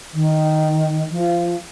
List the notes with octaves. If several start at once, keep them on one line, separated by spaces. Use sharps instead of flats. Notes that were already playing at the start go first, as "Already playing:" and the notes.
D#3
F3